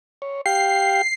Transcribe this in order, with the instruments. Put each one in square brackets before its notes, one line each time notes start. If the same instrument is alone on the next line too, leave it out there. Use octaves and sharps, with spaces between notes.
[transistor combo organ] C#5
[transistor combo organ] G4 F5 G5 [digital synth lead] C7